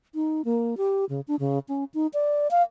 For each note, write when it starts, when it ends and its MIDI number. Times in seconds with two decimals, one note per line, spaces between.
0.15 0.42 63
0.45 0.75 58
0.77 1.05 67
1.09 1.21 49
1.28 1.36 62
1.40 1.59 49
1.68 1.84 61
1.94 2.07 63
2.14 2.48 74
2.51 2.62 77